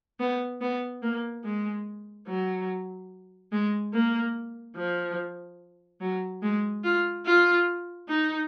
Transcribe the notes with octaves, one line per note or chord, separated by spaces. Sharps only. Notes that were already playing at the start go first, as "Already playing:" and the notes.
B3
B3
A#3
G#3
F#3
G#3
A#3
F3
F#3
G#3
F4
F4
D#4